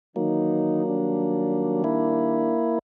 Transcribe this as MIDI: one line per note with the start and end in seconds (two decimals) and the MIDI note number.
0.16 0.83 51
0.16 0.83 52
0.16 1.83 54
0.16 1.83 58
0.16 0.83 63
0.86 2.56 51
0.86 2.56 55
0.86 2.56 62
1.84 2.79 58
1.84 2.79 64